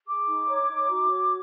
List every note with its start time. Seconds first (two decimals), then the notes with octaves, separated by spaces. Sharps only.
0.06 G#4 D6
0.28 D#4
0.48 C#5
0.69 D#4
0.90 F#4
1.09 C#5